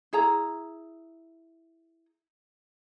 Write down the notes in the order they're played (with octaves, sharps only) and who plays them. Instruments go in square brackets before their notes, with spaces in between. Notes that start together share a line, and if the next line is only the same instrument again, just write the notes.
[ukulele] E4 G#4 A#5